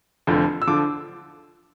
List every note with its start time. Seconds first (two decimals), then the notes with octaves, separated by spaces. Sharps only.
0.27 F1 F2 D3 F3
0.62 E6
0.67 D3 F3 D6